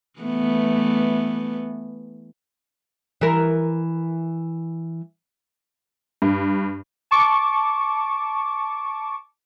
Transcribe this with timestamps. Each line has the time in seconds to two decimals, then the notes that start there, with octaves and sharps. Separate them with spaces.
0.20 E3 A3 B3
3.21 E3 A#4
6.22 G2
7.11 A5 C#6 D6